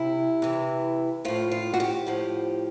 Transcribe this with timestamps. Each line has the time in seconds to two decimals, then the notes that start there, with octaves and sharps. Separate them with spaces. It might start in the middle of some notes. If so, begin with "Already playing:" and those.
Already playing: C3 E4
0.42 C3 E3
1.25 A2 F3 F4
1.51 F4
1.74 F#4
1.80 G4
2.07 A2 F3